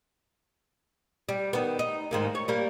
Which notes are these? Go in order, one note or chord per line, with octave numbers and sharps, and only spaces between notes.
G3
D#3 B3
D#4
G#2 D#3 A#3
C#5
G3 A#3